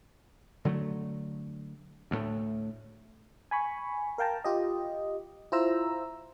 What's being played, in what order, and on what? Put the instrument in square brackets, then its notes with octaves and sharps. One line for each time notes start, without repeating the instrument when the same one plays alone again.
[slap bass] D3 F#3 G#3 A3
D2 A2 A3
[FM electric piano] G#5 B5 C#6
A#4 F5 G5 A5 A#5
F4 G4 D#5
E4 F4 C5 A#5 E6